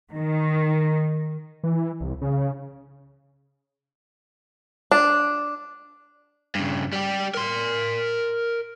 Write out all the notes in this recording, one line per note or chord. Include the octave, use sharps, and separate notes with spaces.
D#3
E3
C2
C#3
D4
G2 C#3
G3 G4
A#4 C6